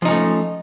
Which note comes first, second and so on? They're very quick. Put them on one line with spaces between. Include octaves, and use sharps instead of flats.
F3 D#4 C#4 A3